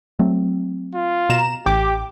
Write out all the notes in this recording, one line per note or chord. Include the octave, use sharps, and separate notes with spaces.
F#3 A3 C4
F4
B2 A#5 E7
A1 G4 G5 D6